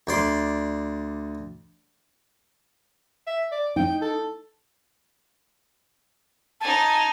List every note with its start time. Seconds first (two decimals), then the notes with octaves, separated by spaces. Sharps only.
0.07 D2 D5 C6
3.27 E5
3.52 D5
3.76 D#4 G5
4.02 A4
6.61 D#4 G#5 A5